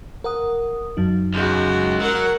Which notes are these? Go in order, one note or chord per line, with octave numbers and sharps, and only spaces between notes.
A#4 F#5 D#6
F#2 F#3 D#4
C#2 G#3 F#4
F#3 A#4 F#5